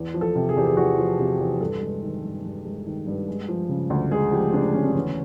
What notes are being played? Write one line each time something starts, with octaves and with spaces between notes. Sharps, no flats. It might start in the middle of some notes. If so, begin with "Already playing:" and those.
Already playing: E2
F3
A4
C3
G#4
E2 G4
G#4
E2 F#4
F3
C3 G4
E2
G2 A4
G#3
D#3
G2
G2
G#3
D#3
G2
G#3
F3
C#3
D2
G#3 G#4
F3 G4
C#3 D4
D2 C#4
D4
E2 C#4